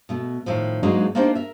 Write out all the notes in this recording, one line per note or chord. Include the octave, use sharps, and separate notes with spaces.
B2 A3 B3
A2 D#3 F3
G#2 F#3 G#3 A#3 D4 D#4
A#3 B3 D4 D#4 G4 C5
A#4 E5